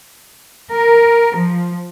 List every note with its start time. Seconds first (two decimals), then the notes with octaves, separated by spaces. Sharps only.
0.72 A#4
1.37 F3